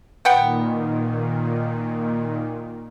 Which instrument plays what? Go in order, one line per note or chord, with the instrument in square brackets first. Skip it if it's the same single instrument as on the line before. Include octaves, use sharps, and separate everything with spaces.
[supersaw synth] A#2 D#3 [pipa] B3 F#5 G5